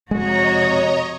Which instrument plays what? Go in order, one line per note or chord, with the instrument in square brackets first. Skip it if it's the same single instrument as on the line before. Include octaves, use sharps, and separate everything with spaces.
[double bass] F2 C3 [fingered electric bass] G#3 [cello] F#4 [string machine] C#5 D#5 A#5